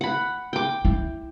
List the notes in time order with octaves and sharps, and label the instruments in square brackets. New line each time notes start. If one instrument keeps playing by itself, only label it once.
[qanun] F#5 B5
G5 D6
[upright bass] E4